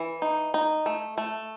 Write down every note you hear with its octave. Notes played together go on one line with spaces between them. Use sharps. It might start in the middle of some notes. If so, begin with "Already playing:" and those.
Already playing: E3
D#4
D#4
A3
A3